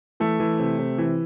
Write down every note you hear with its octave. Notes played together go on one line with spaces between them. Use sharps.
E3 A3
E3
C3
C3
E3